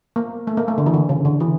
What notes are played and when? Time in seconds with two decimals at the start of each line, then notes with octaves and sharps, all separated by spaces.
0.16 A#3
0.47 A3
0.57 A#3
0.68 A3
0.78 D3
0.86 E3
0.94 D3
1.09 C#3
1.25 D3
1.40 E3